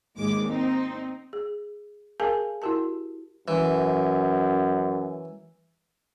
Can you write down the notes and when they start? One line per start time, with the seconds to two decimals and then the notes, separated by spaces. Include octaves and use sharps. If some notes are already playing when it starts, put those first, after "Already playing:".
0.18 G#1 D#2 G#3 D6
0.47 C4 D#4
1.33 G#4
2.20 G#4 A#4 F5 G#5 A5
2.62 E4 F#4 G4 A#4 A5
3.48 F#2 E3